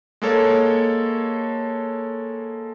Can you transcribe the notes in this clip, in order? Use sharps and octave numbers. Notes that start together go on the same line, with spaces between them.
G#3 A#3 A4 C#5